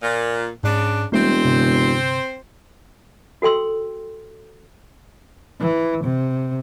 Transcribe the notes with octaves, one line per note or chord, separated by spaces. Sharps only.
A#2
G#2 C#3 D4
E1 G3 A3 A#3 C4 C5
G1 F2 C3
F#4 A4 G5 C6 E6
E3
C3